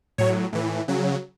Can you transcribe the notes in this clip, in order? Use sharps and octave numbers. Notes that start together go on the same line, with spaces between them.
A2 F#3 C#5
A2 E3
C#3 F#3